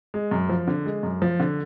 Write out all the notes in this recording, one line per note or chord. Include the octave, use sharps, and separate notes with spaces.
G#3
F#2
F3
D3
G#3
F#2
F3
D3